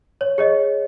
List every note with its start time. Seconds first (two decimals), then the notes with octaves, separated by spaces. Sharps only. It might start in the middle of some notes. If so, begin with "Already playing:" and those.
0.21 C#5
0.38 G#4 C#5 D#5